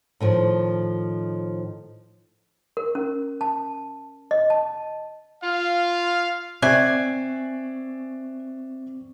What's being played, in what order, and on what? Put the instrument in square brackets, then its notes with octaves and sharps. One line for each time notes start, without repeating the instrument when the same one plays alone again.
[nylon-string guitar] A2 D#3 F3
[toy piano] A#4
C#4
A5
D#5
A5
[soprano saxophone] F4 [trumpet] F5
[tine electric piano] C4 C#6 C7 [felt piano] D5 E5 F#6 [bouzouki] G#5